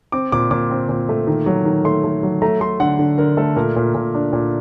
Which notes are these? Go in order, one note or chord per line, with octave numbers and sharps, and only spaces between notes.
C4 D6
A#2 D6
A#2 D6
C4
A#2
A3
D#3
F#3
D#3
A3 C6
A3
F#3
A3 A#5
A3 C6
D3 F#5
D3
D3 A#4
A3 A4
A#2 A#4
A#2
A#2
D4
A#2